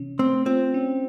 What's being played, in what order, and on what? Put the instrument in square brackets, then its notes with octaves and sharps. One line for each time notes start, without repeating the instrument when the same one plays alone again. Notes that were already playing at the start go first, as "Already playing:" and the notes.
Already playing: [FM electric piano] C3 E3 C#4
[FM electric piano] A3 [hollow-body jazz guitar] C4
[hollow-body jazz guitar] C4 [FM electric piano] F4
[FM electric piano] C#4